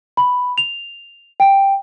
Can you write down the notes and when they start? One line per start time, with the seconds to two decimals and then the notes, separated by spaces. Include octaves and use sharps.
0.17 B5
0.58 F7
1.40 G5